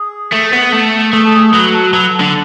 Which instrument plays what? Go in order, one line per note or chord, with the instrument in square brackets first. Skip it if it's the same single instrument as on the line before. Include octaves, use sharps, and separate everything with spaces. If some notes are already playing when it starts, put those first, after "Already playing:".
Already playing: [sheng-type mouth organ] G#4
[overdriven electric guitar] A3
B3
A3
[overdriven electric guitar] A3 [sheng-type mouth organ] G#4
[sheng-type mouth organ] A4
G#4
[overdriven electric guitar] F#3 [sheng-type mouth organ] B4
[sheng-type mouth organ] A4
[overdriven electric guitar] F#3 [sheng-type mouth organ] B4
[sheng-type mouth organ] A4
[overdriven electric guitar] D3